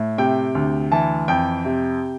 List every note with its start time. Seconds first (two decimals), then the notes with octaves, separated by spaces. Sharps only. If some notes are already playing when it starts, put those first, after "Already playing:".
Already playing: A2
0.18 C3 G5
0.55 D2
0.92 E3 A5
1.28 F2 G5
1.65 C3